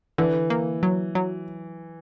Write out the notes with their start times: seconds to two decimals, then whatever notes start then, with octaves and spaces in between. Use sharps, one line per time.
0.18 D3 E3
0.50 A#3
0.83 F#3
1.15 F#3